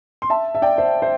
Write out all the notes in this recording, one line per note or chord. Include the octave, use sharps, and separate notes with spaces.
C6
E5 A5
E5
D5 G5
C5 E5
C5 E5